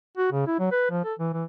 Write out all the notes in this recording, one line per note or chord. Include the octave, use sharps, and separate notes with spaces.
F#4
C#3
E4
F#3
B4
F3
A4
E3
E3